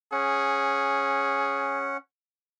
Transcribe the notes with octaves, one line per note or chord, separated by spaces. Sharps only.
C#4 G#4 F#5